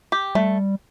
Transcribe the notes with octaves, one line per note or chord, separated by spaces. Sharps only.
G4
G3 A3